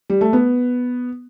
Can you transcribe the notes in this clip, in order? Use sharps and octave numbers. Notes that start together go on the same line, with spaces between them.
G3
A3
B3